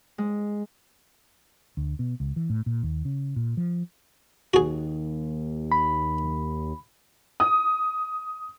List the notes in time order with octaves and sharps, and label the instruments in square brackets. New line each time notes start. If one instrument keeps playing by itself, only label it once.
[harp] G#3
[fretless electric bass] D2
B2
C#2
E3
A2
A#2
D#2
C#3
A#2
F3
[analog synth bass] D#2 [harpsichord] F#4 G#4
[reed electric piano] B5
[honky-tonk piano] D#6